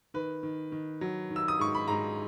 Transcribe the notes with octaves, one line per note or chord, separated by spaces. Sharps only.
D#3 B4
D#3
D#3
F#3
D#3
E6
D#6
G#2 C#6
B5
G#2 A#5